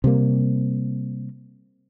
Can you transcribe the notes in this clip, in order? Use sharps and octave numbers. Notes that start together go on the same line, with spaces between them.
C3 G3 A#3